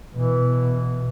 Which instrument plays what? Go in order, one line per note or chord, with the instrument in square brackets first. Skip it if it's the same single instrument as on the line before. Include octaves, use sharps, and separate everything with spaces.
[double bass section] B2 [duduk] E3